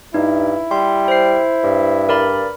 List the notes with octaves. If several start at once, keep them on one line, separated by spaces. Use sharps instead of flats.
G2 D#4 E4
G3 C6
C5 C7
G2
A#4 D5 B5